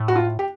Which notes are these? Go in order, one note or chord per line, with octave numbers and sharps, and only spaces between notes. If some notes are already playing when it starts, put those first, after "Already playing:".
Already playing: A2
F#4
F4
G4